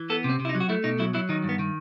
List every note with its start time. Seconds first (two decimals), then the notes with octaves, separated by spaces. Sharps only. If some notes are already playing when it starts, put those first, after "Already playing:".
Already playing: E3
0.10 B3 A4
0.24 C3
0.30 C4
0.40 C3
0.45 E4
0.49 D#4
0.55 F#3
0.60 F#4
0.69 A3 E4
0.84 B2 D#4
0.99 F#3 E4
1.14 F#3 E4
1.29 D#3 D#4
1.44 G2
1.49 B3
1.59 D#3